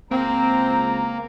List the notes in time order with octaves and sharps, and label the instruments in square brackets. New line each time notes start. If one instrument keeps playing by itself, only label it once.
[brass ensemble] C#2 A#5 [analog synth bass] A#3 [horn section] C4